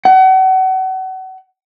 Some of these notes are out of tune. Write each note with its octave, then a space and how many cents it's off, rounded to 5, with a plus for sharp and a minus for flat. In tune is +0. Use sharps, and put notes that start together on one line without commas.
F#5 +35